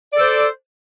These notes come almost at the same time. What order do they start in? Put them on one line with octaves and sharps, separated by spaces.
D5 A4 C5